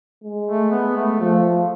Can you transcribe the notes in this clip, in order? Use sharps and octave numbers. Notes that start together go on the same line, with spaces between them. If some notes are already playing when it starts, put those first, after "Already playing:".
G#3
A3
B3
A3
F3 A3